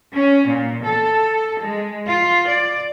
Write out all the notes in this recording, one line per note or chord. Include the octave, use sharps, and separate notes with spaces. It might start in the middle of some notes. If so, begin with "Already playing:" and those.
C#4
A#2
A4
G#3
F4
D5